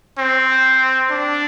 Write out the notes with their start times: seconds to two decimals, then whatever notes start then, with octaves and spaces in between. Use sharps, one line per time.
0.18 C4
1.11 D4